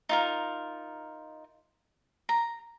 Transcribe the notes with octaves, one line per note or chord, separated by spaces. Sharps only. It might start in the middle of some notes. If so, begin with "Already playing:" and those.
D#4 F4 A#4
A#5